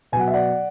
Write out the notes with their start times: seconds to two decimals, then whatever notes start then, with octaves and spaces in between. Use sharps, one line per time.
0.12 B2 G#5
0.16 F#3 F#5
0.28 E5
0.34 D5 F#5